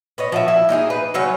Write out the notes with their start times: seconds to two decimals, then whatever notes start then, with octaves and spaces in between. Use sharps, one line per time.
0.18 B4 C#5 D#5
0.32 F3 F#4 E5
0.48 E4
0.69 A#3 D#4 F#4 G#4
0.90 B4
1.14 C#3 F#3 C#5